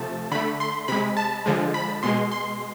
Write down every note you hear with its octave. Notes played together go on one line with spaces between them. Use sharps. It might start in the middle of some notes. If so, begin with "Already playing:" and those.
Already playing: C3 F3 A3 A5
D3 A3 B5
C6
C3 G#3 B5
A5
D3 F3 G#3
B5
B2 G#3 C6
C6